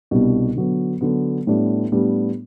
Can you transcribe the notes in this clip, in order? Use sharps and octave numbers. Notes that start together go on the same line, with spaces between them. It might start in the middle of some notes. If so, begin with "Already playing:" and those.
C2 B2 G3 D4
D3 F#3 B3
D3 F#3 B3
A2 G3 B3 D4
A2 G3 B3 D4